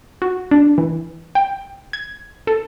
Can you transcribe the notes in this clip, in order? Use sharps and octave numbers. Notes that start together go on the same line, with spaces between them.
F#4
D4
E3
G5
G#6
A4